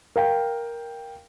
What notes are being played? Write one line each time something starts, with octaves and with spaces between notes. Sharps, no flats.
A#4 F5 G5